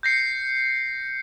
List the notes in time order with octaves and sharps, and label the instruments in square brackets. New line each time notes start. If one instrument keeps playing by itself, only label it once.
[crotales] G6 A#6 C7 C#7